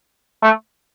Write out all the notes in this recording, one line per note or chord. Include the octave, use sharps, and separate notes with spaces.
A3